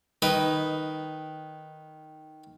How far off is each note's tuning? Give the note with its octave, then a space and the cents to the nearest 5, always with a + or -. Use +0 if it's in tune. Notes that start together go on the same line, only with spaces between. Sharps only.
D#3 +0 B4 +0 D#5 +20